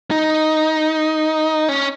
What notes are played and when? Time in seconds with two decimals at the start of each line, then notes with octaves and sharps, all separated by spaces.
0.11 D#4
1.69 C#4